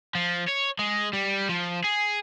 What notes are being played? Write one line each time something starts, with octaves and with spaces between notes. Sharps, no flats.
F3
C#5
G#3
G3
F3
G#4